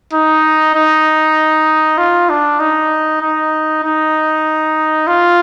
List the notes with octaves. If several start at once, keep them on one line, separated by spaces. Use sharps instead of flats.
D#4
D#4
F4
D4
D#4
D#4
D#4
F4